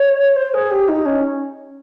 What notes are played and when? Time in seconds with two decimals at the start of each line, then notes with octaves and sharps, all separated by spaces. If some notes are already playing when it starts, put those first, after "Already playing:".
Already playing: C#5
0.36 C5
0.54 G#4
0.71 G4
0.88 D#4
1.06 C#4